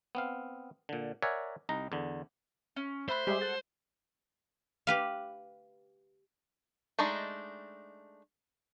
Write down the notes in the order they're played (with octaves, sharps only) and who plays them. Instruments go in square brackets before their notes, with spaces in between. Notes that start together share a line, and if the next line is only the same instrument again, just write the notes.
[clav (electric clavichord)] B3 C4 F5
A#2 D3
A#4 C#5 D5 E5 F#5 G#5
C2 D#4 A#5
E2 D3
[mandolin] C#4
[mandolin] A3 B5 F#6 [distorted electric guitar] C5
[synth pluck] G3 G#3 [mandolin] G4 G#4 E5
[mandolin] A4 F#5
[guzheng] G4 B4 F5
[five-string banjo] G#3 A3 D4 D#4